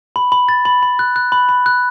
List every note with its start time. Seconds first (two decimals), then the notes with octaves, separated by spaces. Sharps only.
0.16 B5
0.32 B5
0.49 A6
0.65 B5
0.83 B5
0.99 F#6
1.16 F#6
1.32 B5
1.49 B5
1.66 F#6